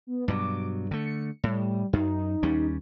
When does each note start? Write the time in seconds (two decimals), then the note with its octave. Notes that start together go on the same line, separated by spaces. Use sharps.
0.07 B3
0.28 G2 B2 F#3 D6
0.91 D3 A3 C#7
1.44 A2 G3
1.93 F#2 D#4
2.43 D#2 G3 C#4